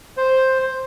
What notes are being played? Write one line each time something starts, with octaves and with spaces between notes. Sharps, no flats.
C5